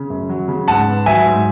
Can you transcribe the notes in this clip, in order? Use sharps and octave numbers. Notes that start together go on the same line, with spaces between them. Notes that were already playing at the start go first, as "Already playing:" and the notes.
Already playing: C#3
F#2
F#3
C#3
G#2 F#5 A5
B3
F#3 E5 G#5
G#2